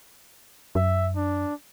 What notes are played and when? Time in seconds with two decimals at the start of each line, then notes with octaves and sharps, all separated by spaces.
0.75 F#2 E5
1.16 D4